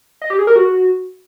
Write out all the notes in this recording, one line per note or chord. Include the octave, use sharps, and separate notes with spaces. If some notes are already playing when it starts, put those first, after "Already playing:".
D#5
G4
G#4
A#4
F#4